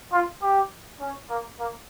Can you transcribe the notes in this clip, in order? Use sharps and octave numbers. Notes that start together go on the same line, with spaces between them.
F4
G4
C#4
A#3
A#3